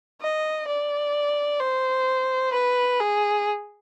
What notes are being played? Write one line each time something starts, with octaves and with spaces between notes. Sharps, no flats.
D#5
D5
C5
B4
G#4